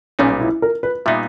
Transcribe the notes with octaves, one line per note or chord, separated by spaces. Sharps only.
B1 A#2 G3 B3 C#4 D#4
E4
A#4
B4
A#2 G3 B3 D#4 E5